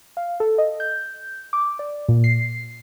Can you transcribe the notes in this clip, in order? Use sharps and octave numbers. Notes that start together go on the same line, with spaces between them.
F5
A4
D#5
G6
D6
D5
A#2
C7